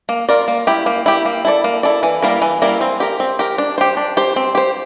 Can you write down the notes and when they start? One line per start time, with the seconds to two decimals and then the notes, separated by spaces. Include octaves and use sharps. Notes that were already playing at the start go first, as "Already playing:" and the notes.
0.09 A#3
0.29 F4 A#4 D5
0.48 A#3
0.67 E4 G4
0.86 A#3
1.06 E4 G4
1.25 A#3
1.45 E4 A4 D5
1.64 A#3
1.83 E4 A4 D5
2.03 E3
2.23 G3 A#3 E4 A#4
2.42 E3
2.62 G3 A#3 E4 A#4
2.81 C4
3.00 G4 A#4
3.20 C4
3.39 G4 A#4
3.58 D4
3.78 G4 C5
3.97 D4
4.17 G4 C5
4.36 C4
4.55 G4 C5